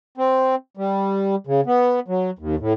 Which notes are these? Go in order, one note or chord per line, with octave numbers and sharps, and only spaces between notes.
C4
G3
C#3
B3
F#3
D#2
A2